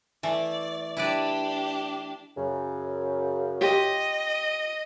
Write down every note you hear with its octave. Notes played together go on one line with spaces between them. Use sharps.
E3 A3 D5
D4 E4 G4 B4 D5
F#2 C#3
F4 G4 D#5